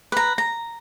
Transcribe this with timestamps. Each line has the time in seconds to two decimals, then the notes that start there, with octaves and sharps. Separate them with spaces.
0.12 B4 A#5
0.38 A#5